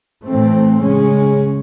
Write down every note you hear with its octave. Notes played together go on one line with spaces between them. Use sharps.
A2 E3 A3 C4
C#3 G#3 C#4